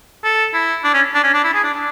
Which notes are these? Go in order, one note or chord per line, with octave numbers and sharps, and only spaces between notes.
A4
E4
D4
C#4
D4
C#4
D4
E4
G#4
D4
D4